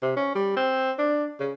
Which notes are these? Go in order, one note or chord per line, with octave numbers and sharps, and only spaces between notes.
C3
C#4
G3
C4
D4
C#3